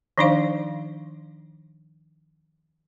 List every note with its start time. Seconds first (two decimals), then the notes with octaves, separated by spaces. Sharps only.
0.18 D#3 F3 D4 D#4 C5 F5